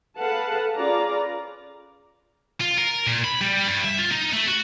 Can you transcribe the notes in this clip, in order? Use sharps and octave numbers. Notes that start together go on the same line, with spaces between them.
G#4 A4 B4 F5 F#5 A5
C#4 F4 G#4 B4 D5 A#5
F4
A#4
A#2
B5
G3
G2
E5
F4
D#4
A3
F#4